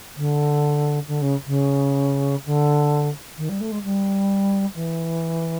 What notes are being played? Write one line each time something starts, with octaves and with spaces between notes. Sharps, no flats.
D3
D3
C#3
C#3
D3
D#3
G3
A3
G#3
G3
E3